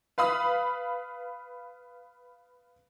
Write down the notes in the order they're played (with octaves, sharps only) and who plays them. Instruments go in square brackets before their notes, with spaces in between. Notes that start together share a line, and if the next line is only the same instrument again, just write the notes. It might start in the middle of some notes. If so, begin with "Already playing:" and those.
[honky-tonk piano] B4 F5 B5 D#6